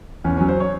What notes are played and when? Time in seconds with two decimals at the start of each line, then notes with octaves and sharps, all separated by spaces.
0.24 E2 C#4
0.37 F#3 C#4
0.49 C5
0.60 C#5